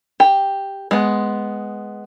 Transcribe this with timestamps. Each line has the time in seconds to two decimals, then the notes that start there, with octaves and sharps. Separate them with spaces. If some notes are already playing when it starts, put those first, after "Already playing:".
0.20 G4
0.91 G#3 B3